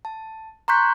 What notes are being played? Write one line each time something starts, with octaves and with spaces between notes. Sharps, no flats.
A5
A#5 C6 C#6 F#6 G6 B6